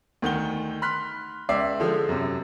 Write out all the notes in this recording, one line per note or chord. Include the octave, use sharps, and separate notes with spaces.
D2 D#3 F#5 G7
B5 C6 F6 F#6 B6
C#2 D5 E5 C7
D3 F3 G#3
F#2 C3